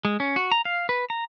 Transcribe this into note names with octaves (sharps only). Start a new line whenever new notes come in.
G#3
C#4
F#4
A#5
F5
B4
A#5